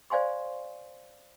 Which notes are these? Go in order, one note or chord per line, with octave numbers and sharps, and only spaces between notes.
C5 D5 F5 G#5 C6 C#6